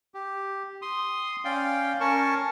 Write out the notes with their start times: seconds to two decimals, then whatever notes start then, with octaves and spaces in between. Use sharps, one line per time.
0.14 G4
0.82 C6 D#6
1.45 C#4 D5 F5 G5
2.00 C#4 A#4 A5 C#6